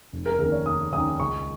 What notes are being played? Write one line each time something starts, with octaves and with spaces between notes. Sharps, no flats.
F1
A#4
D#2 D#3 C#4 A#4
C#5
F1 D#6
D#2 D#3 C#4 D#6
C#2 C#6